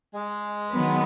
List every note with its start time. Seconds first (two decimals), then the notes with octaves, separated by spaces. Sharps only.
0.14 G#3
0.73 D#3 F#3 B3